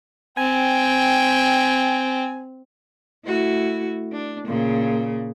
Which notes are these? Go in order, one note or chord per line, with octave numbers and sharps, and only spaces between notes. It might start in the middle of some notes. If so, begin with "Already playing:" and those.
C4 G5 G#5
A3 E4 F#4
D4
A#2 C#3